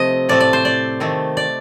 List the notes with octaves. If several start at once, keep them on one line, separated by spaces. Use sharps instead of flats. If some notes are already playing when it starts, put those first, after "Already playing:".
Already playing: C3 F3 A3 C4 D#5
A2 A3 C4 D5
D5
C5
D5
D#3 A3 C4
D5